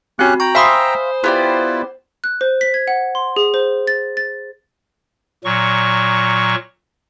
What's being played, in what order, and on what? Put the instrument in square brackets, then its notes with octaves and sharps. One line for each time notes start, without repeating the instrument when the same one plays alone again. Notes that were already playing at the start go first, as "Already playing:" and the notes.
[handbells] C4 F#4 [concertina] C#4 G4 F#6
[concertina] G5 A#5 [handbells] C#6
[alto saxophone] C5 [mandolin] E5 F5 C6 [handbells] G#5 B5 D#6
[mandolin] B3 G4 D5 [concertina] E4 F4
[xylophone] F#6
C5
B6
G#6
F#5
C6
G#4
C5
A6
A6
[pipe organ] A#2 F#3 C#6